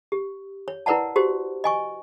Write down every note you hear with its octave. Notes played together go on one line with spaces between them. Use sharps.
G4
C#5
E4 A#4 B4 D5 F#5 A5
F#4 G4 C5
D#5 G#5 C#6